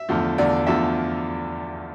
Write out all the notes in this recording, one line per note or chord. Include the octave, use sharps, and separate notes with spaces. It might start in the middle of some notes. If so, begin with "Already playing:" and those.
Already playing: E5
E2 D3 F3 A3
E2 D3 F3 A3 D5
E2 D3 F3 A3 E5